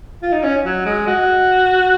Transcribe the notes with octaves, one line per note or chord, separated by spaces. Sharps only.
F4
D#4
C#4
F#3
G#3
F#4